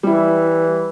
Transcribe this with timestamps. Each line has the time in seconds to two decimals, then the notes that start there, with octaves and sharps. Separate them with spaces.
0.03 E3 G3 E4